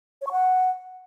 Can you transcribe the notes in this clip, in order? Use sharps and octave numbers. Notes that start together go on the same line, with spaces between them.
C#5
C#6
F#5